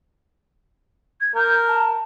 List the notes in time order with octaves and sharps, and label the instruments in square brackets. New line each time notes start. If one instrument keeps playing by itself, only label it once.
[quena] G#6
[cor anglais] A#4 [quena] G6
[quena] A5